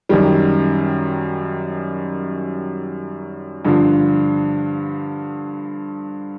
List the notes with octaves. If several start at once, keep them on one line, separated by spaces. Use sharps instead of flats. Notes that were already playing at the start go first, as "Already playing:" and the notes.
F#2 D#3 G3
G2 D3 F3